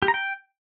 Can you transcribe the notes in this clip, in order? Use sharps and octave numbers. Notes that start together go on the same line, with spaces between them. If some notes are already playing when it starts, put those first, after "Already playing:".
G4
A#5
G5